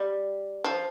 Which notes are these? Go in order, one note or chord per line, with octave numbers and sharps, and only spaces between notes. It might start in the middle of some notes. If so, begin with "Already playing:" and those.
Already playing: G3
F3